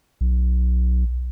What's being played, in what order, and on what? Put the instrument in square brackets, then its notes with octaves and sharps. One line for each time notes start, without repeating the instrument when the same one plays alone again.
[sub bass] B1